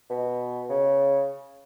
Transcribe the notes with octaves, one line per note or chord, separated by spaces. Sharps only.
B2
C#3